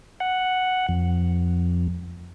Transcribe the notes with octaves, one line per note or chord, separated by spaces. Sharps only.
F#5
F2